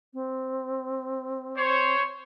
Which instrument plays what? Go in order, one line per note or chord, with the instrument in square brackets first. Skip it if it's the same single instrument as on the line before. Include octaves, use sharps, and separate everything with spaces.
[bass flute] C4
[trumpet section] C5 C#5